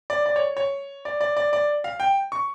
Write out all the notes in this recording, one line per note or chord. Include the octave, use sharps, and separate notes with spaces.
D5
D5
C#5
C#5
D5
D5
D5
D5
F5
G5
C#6